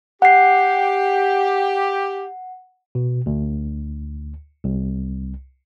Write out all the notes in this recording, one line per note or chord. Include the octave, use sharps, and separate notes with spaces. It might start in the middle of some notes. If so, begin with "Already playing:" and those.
G4 F#5 C7
B2
D2
C2